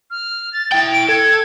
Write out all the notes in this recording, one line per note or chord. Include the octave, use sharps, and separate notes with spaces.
F6
A6
E4 G5
D7
A4 G#6